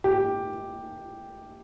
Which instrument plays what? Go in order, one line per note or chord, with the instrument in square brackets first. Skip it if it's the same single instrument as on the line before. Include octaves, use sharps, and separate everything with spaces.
[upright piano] G4